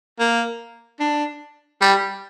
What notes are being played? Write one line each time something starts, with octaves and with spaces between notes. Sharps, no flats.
A#3
D4
G3